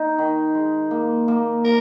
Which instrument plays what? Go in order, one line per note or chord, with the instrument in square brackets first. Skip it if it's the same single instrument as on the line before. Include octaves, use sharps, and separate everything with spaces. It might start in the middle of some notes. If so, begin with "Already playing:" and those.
Already playing: [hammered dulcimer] D#4
D#3
G#3
A#3
A#3
[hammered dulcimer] A#3 [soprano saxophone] A#4